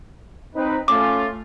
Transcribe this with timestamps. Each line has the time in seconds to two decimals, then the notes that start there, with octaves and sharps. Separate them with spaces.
0.55 C4 D#4 B4
0.88 A3 C#4 F4 D6